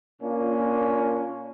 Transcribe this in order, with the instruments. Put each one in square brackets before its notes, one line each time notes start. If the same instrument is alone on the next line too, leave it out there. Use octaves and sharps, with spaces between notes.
[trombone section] A#2 A#3 C#4 D4 F4